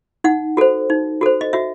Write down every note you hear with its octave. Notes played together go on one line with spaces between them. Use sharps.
D#4 F#5
F#4 A4 C5
D#4
F#4 A4 C5
D#5
F#4 E5